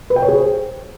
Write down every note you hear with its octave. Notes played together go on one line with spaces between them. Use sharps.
B4
G5
C#5
G#4
C5